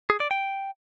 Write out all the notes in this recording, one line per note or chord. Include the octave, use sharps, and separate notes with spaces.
G#4
D5
G5